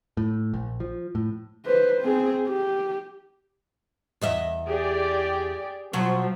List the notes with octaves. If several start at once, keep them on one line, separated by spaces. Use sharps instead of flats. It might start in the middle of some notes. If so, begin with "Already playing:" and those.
A2
A#1
F3
A2
B4 C5
C4 G#4
G4
E2 D#5 E5
G4 G#4 D5
B2 F3 F#3